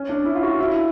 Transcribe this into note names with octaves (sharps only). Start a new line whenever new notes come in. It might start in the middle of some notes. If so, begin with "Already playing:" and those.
Already playing: C#4
D4
E4
F4
F#4
E4